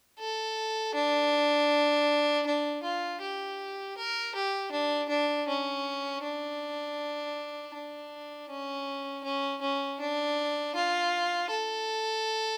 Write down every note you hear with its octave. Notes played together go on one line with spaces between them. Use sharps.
A4
D4
D4
F4
G4
A#4
G4
D4
D4
C#4
D4
D4
C#4
C#4
C#4
D4
F4
A4